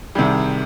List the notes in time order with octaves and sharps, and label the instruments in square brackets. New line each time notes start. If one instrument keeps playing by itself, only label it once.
[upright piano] C2 C3 D#3 G3 G#4